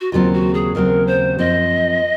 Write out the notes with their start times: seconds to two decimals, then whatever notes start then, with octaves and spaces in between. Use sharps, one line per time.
0.01 F#4
0.12 D#2 C#3 F#3 C4 F4
0.33 F#4
0.54 G#4
0.75 D#2 C#3 F#3 C4 A#4
1.07 C5
1.38 F#2 F3 C4 D#5